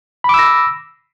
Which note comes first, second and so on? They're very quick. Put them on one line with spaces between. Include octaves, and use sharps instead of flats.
B5 D6 E6 A#6